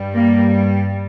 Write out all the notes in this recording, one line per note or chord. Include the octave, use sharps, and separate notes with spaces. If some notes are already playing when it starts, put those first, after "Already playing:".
Already playing: G2 G3
A#3